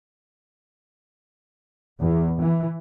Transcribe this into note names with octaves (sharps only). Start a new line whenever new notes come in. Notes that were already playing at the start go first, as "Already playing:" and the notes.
E2
E3